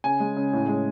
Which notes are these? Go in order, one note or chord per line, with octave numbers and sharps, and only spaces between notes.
C#3 G#5
G#3
C#3
A2
G#3